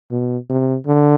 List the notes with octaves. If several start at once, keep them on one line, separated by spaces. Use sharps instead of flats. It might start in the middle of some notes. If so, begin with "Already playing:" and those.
B2
C3
D3